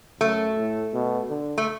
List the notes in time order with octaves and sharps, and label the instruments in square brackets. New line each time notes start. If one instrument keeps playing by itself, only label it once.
[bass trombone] F#2 [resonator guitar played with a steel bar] A3
[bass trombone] A2
B2
D3
[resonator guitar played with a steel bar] A3